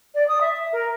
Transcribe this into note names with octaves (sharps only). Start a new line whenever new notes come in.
D5
D#6
E5
A#4